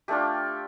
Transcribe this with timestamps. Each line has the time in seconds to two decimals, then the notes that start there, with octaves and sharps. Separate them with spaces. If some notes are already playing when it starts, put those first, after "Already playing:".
0.08 A3 D4 F4 G4